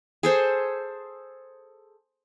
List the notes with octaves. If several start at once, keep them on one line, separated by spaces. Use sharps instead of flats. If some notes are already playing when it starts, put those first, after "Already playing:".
G#4 A4 C5